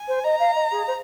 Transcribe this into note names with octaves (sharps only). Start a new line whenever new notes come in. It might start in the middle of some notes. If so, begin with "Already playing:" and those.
Already playing: G#5
C5
D#5 A#5
F5
D#5
G#4
C5